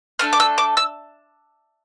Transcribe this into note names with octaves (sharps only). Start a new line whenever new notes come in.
A3 D4 A4 F6
D6
E6
D6
E6